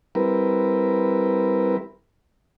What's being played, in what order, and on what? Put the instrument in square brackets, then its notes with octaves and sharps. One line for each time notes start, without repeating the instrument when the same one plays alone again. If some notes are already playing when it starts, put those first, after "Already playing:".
[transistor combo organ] G3 C4 E4 A#4 B4